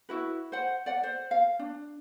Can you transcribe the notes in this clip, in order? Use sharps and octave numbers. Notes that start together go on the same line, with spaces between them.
E4 F#4 B4
C5 F#5
D5 F#5
C5
F5
D4